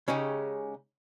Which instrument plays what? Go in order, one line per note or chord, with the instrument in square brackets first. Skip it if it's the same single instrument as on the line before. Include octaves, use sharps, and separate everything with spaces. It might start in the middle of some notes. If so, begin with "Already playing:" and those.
[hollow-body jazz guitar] C#3 G#3 C#4 D#4 G4